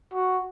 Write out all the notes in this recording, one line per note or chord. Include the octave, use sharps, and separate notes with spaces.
F#4